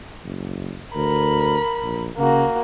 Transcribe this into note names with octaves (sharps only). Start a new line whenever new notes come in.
F#1
D2 A#4 B5
A#1
C#3 A#3 F#4